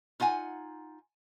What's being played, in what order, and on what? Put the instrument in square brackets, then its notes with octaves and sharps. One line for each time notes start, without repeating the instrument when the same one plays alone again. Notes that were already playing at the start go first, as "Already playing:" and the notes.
[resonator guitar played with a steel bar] D#4 F4 F#5 G#5